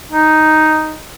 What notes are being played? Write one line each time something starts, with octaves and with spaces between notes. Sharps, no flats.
D#4